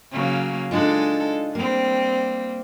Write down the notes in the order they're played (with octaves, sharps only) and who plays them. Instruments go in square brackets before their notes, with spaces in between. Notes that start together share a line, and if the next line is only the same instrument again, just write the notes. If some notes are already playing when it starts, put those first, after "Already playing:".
[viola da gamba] C#3 F#3 A#3
[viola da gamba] G#3 A4 [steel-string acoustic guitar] D4 D#4 F4
[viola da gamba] G3 C4 [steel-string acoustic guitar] A#3